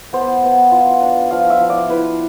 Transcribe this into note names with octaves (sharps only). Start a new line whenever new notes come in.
B3 C5
B3
F4
D4
F3 F5
E5
F3
D5
E4 B4